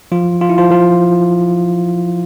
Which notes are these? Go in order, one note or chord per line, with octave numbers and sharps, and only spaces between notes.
F3 F4
F4
E4
F3 F4
F3 F4